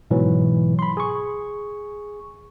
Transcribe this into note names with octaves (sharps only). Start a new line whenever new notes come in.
G#2 B2 E3 F#3
B5 C6
G#4 C#6